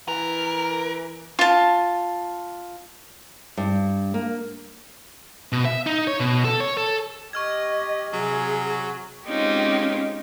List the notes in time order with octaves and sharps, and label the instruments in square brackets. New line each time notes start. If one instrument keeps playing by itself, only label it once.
[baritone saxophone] E3 [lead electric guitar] A#4
[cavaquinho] F4 A5
[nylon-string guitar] G2
A#3
[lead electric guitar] B2
E5
D#4
C#5
B2
A4
C#5
A4
[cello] G4 D#5 [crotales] C#6 F6 G#6
[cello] C3 G#4 [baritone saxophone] F#3
[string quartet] G#3 C4 C#4 D#4 F4 G4